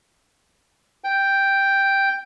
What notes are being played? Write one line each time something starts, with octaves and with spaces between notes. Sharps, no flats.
G5